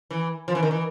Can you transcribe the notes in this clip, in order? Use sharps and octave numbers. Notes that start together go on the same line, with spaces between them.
E3
F3
E3
D#3
E3